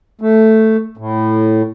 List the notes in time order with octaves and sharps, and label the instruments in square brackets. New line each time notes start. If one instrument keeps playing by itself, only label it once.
[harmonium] A3
A2